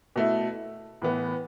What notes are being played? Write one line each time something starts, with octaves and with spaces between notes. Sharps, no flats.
B2 A3 E4
A2 E3 B3